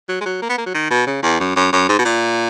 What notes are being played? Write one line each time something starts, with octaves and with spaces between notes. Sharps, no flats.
F#3
G#3
F#3
A#3
B3
A#3
F#3
D#3
B2
C#3
E2
F#2
F#2
F#2
G#2
B2
A#2